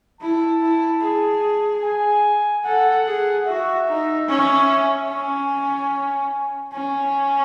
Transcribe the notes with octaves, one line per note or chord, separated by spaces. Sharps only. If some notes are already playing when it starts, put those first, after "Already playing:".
E4 A5
E4
G#4
G#5
A4 F#5
G#4
F#4 E5
D#4
C#4
C#4 G#5
C#4 G#5